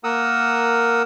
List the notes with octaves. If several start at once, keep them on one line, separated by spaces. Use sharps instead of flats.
A#3 A#4 F#5 D#6 E6